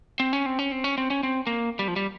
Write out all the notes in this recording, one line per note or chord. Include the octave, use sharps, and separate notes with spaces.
C4
C#4
C4
C#4
C4
C#4
C4
C#4
C4
A#3
G3
F3
G3